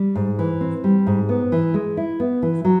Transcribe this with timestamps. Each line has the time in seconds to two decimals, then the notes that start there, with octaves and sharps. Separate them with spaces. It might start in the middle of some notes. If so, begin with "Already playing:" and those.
Already playing: G3
0.15 G#2
0.39 E3
0.61 C4
0.84 G3
1.07 G#2
1.29 B3
1.52 E3
1.74 G#3
1.97 E4
2.20 B3
2.42 E3
2.65 F#3